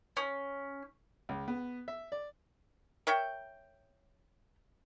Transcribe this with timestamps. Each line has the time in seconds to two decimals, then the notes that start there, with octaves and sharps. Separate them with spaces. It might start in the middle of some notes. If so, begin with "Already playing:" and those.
0.17 C#4
1.29 C#2
1.48 B3
1.88 E5
2.12 D5
3.07 A#4 C#5 E5 G5